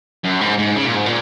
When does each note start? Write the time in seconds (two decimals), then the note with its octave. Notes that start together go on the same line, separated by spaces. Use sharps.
0.24 F#2
0.41 G#2
0.58 G#2
0.76 C#3
0.85 A#2
0.95 G#2
1.06 A#2